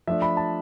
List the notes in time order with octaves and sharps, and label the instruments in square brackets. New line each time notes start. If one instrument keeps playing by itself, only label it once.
[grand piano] F3 A3 D4 E5
B5
A5